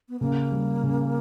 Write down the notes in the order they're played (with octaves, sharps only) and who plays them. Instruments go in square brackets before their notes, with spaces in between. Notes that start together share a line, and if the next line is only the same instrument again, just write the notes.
[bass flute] B3
[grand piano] C#3 [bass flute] A#3
[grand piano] G3
C#3